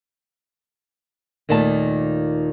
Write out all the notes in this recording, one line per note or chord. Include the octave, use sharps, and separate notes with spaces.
D#2 A#2 D#3 A3 A5